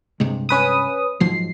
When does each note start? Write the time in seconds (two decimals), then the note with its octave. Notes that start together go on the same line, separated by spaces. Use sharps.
0.20 G2 C3 G#3
0.49 C#4 B4 D#6
1.20 G#2 F3 F#3 C7